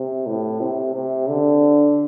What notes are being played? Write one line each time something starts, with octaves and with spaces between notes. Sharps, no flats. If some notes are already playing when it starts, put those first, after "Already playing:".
Already playing: C3
A2
C3
C3
D3